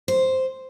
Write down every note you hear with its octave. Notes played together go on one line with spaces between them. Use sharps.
C5